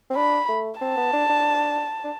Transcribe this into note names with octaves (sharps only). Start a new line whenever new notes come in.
C4
D4 B5
A3
C4 A5
B3
D4
D4
D4